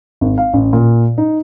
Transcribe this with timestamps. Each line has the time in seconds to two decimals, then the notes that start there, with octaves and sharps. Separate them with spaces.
0.21 G#1
0.38 F5
0.54 A1
0.73 A#2
1.18 D#4